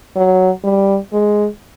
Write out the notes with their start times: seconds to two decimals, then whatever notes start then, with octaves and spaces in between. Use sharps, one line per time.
0.16 F#3
0.64 G3
1.13 G#3